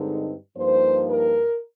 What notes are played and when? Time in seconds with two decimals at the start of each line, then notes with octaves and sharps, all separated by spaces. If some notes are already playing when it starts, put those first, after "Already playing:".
Already playing: G2 D3 G#3 C4 D#4
0.55 G2 F3 A#3 D#4 C5
1.10 A#4